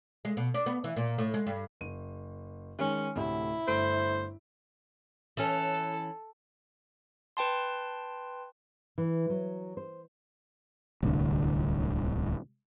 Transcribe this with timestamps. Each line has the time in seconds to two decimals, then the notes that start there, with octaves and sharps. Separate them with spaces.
0.25 G#3
0.37 B2
0.54 D4
0.66 B3
0.84 E3
0.96 A#2
1.18 A2
1.34 G#3
1.47 G2
1.81 F#1 D#7
2.79 D#3 G#3 C#4
3.15 D2 A2 C3 E4
3.68 G1 A3 C5 D7
5.37 E3 C#4 A4
7.37 B4 G5 A5 C6
8.98 E3
9.30 F#3
9.77 C5
11.03 D1 C2 D3